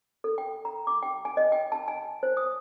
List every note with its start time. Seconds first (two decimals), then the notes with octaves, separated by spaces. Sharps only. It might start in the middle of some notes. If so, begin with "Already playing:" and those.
0.24 A4
0.38 G5
0.65 A#5
0.87 D6
1.03 G5
1.25 G#5
1.37 D#5
1.52 G5
1.72 A5
1.88 G#5
2.23 C5
2.37 D#6